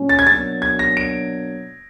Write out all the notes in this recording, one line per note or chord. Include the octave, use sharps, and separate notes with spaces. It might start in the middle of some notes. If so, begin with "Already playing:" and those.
Already playing: A#2 G3 C#4
A6
G#6
B2 F#3 A#3 D4 A6
G#6
A#6
D7